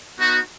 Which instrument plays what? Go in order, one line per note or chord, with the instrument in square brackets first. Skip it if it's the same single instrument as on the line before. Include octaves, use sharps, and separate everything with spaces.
[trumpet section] B3 D#4 F#4